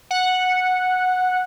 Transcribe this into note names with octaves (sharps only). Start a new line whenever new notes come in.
F#5